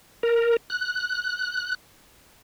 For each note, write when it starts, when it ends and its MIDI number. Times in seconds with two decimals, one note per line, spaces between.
0.23 0.57 70
0.70 1.75 90